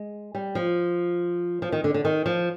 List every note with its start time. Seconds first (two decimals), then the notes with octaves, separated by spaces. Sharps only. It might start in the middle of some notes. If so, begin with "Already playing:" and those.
Already playing: G#3
0.35 G3
0.55 F3
1.62 F3
1.72 D#3
1.84 D3
1.94 D3
2.05 D#3
2.26 F3